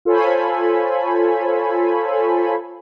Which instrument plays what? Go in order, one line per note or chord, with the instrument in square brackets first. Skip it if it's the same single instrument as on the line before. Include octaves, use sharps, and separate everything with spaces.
[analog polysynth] F4 A4 C5 C#5 G#5 B5